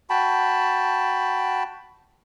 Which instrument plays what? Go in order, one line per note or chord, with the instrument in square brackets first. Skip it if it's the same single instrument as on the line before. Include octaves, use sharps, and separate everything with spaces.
[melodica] F#4 G5 A5 B5